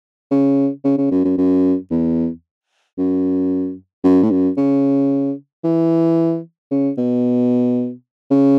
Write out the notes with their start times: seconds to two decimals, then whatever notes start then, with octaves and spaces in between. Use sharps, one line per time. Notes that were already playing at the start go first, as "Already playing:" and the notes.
0.31 C#3
0.84 C#3
0.98 C#3
1.11 F#2
1.24 F#2
1.38 F#2
1.90 E2
2.98 F#2
4.04 F#2
4.23 A2
4.31 F#2
4.57 C#3
5.64 E3
6.71 C#3
6.97 B2
8.31 C#3